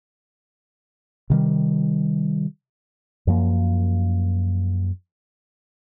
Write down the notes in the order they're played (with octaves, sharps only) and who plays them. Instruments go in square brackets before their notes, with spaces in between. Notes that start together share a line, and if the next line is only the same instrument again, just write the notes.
[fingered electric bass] C3 D#3 G3
F#2 F3 A#3